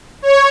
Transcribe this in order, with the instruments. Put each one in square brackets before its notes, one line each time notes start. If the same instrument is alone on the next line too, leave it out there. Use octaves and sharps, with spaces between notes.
[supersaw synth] C#5